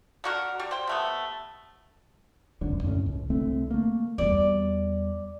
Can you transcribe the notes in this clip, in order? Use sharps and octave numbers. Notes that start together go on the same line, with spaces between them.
D3 F#4 A#4
G3
C5 G5
C3 A3 B3
F1 C#2 F#2 D3
F#2 A2 D3 C#4
C#2
C2 D3 A3 C4
A3 A#3
E2 G3 D5